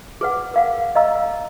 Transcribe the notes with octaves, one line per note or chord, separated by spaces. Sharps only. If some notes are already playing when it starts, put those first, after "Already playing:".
G#4 B4 F#5
A#4 F5 F#5
D#5 F5 A#5 E6